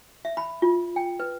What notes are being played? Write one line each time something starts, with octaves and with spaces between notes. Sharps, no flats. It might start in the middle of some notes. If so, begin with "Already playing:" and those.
E5
B5
F4
G5
B4